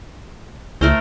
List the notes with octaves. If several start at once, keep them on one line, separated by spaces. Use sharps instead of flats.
C#2 A3 A#4 C5